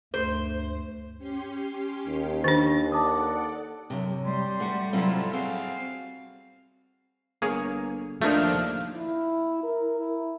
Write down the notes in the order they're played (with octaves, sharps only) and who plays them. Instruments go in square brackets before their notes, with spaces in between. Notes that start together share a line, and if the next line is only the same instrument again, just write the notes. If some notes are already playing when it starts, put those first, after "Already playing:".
[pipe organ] D2 G2 A3 [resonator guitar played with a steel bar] C5
[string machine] C#4 G4 C6
[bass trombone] D#2
[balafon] D#3 D4
[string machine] A4 D5 F#5 [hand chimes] A5 D6 D#6
[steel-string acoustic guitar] F#2 C3
[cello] G3 [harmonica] C6
[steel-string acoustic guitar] A3 F#4 F#5
[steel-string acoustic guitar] C3 F#3 C4 [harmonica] E4 F4 A4
[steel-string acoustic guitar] C4 [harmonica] F#4 G#4 F5
[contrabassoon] G1 [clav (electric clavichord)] A#3 G#4 C#5
[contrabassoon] D#2 [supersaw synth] F3 D4 [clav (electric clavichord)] A3 A#3 D#4 [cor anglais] F5
[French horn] E4
A#4
E4